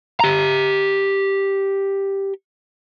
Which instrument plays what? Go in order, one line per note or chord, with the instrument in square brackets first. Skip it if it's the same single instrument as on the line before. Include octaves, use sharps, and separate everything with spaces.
[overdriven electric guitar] G4 A#5